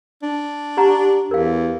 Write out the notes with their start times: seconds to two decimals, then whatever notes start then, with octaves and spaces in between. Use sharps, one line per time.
0.23 D4
0.77 G4 F#5 A#5
1.31 E2 A#4 F5